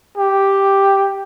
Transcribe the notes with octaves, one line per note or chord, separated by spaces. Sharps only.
G4